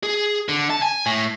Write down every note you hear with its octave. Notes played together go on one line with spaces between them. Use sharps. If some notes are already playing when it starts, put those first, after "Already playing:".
G#4
D3
A5
G#5
A2